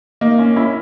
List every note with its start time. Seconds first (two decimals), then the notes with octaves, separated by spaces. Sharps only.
0.21 A#3 D#4
0.39 C#4
0.56 C#4 E4